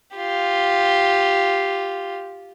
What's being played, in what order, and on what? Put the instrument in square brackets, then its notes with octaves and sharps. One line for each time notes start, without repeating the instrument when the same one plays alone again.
[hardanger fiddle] F4 G4